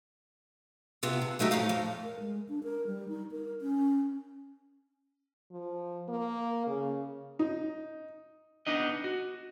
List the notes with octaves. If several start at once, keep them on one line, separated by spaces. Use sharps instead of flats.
C3 B3 F4
D3
F#3 A3 D#4 G4
F2 A2 D#4 F5
F2
A#4
G#3
D4
A#4
G3
D#4
A#4
C#4
F3
A#3
C#3
D#4
B3 D4 D#4 D#5
F#4